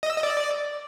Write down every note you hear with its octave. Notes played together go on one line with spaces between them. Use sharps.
D#5
E6
D#5
D5